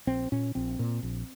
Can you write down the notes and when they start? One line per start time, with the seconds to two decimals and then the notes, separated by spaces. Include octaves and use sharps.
0.07 A#1 C4
0.32 A#2 C#4
0.55 A#1 C4
0.79 A#2
1.03 A#1